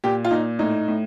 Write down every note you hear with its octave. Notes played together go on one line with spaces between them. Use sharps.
A#2 G4
F4
A#2 D#4
A2 D#4
A2